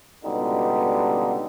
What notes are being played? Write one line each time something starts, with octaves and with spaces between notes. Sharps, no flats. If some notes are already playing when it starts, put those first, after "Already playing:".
C#2 B2 D3 G3 D#4